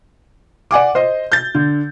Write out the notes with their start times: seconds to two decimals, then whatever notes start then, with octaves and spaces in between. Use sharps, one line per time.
0.71 D5 F#5 G#5 D6
0.95 C5 D#5
1.32 G6 A6
1.55 D3